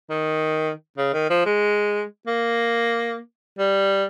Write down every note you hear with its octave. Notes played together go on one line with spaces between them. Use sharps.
D#3
C#3
D#3
F3
G#3
A#3
G3